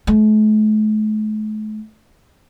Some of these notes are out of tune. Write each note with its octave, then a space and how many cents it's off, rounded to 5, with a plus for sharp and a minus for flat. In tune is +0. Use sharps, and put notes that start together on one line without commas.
A3 -45